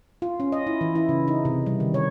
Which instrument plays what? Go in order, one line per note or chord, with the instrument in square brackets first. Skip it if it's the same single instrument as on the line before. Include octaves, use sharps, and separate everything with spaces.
[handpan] F4
C#4
D#5
E4
E3
E4
C#3
D#4
C3
G3
D#3
C#5